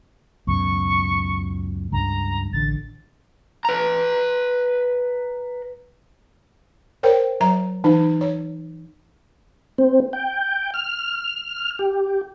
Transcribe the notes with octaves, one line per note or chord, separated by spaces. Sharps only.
C#2 F#2 B2 C#6
C#2 G2 A#5
A1 D3 A6
B4 A#5
A#4 C5 C#5 G5
F#3 E5 A#5
E3 D#4
C#5
C4
G5
F6
G4